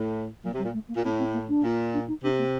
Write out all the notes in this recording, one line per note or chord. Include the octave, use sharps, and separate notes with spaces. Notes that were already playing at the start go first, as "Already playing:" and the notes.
Already playing: A2
A#2 F#3
C3
G3
A#2
A3
A#3
A#2
A2 C4
C4
A#3
D4
A#2
D4
D#4
C3 D4
A#3